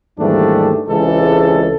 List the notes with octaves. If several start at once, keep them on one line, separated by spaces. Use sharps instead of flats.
D#2 G#2 E3 G3 A3 D4
C#2 C3 E3 G#3 A4